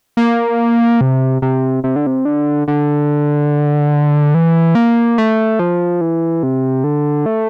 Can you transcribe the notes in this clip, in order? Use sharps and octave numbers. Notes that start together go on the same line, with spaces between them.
A#3
C3
C3
C3
D3
C3
D3
D3
E3
A#3
A3
F3
E3
C3
D3
A3